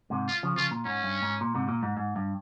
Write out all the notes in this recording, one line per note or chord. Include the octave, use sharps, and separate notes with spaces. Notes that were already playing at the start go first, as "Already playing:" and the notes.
G#2 C3
F4
C#3 F3
C#3 F3 F4
A#2
G#2 C#4
G2
G#2
A#2
G#2 C3
A#2
G#2
G#2
G2